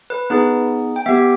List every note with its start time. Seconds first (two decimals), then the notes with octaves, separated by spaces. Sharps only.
0.10 B4
0.30 B3 D#4 G#4 B4
0.96 G5
1.06 B3 G4 E5